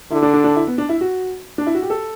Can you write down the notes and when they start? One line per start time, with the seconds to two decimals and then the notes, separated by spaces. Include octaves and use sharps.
0.11 D3 E4
0.23 D4
0.34 D4
0.44 D4
0.56 E4
0.67 B3
0.78 D4
0.89 E4
1.01 F#4
1.58 D4
1.67 E4
1.74 F#4
1.82 G4
1.90 A4